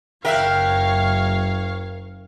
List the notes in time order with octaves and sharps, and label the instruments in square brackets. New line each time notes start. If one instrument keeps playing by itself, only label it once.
[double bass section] F#1 [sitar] A#4 E5 [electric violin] C#5 F5 [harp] G5 F#6